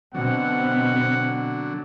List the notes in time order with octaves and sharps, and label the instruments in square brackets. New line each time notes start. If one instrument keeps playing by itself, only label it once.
[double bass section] B2 C4 [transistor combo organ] D3 F#3 [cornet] F#5